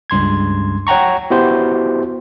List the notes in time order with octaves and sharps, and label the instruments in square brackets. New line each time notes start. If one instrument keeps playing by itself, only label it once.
[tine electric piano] C#2 G2 C6 G#6
C#5 F#5 G5 A#5 C#6
B3 E4 F#4 G4 C5